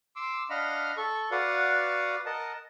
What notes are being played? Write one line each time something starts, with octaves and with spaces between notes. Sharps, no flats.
C6 D6 E6
D4 D#5 F5 F#5 B5 F6
A4 C#6
F#4 B4 D5 F5 F#5
A#4 D#5 F#5 A5